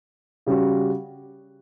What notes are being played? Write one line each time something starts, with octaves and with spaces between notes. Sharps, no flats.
C#3 G3 C#4 F#4